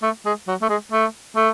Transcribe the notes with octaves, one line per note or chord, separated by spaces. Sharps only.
A3
G#3
F#3
A3
G#3
A3
A3